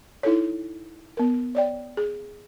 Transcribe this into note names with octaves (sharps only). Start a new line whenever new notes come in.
D#4 E4 A4 C#5
B3 A#4
C#5 D5 G5
G#4